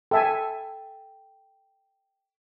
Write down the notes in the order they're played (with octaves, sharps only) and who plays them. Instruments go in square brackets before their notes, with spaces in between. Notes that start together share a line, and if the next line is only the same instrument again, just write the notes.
[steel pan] A4 E5 G#5 [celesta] G5